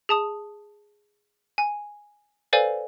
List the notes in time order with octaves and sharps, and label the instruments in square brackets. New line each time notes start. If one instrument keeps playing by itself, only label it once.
[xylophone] G#4 A5 D#6
G#5
A4 B4 C5 D5 F5 G#5